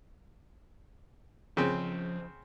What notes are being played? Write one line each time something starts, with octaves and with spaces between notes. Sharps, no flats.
C#3 F3 C4 C#4